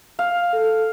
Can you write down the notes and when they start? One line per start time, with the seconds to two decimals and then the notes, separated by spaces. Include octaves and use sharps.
0.19 F5
0.53 A4